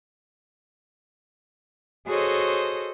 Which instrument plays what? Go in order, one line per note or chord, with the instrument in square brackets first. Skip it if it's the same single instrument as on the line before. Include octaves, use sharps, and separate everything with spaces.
[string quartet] F#4 G#4 A4 C5 C#5 D#5